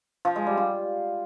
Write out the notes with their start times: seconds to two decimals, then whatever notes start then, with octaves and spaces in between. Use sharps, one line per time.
0.25 F3
0.36 G#3
0.47 G3
0.57 F4